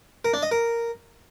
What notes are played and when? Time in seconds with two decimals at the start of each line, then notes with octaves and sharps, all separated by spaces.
0.25 A#4
0.34 D4
0.43 D#5
0.51 A#4